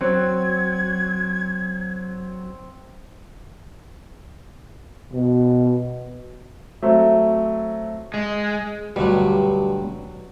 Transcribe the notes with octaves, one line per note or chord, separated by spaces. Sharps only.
F#3 C4 G#6
B2
F#3 A3 C4
G#3
D2 G2 B2 F#3 G3